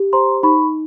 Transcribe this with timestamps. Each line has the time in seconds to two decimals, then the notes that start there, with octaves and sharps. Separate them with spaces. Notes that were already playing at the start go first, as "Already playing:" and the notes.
Already playing: G4
0.13 C5 A#5 C6
0.43 D#4 B5 C#6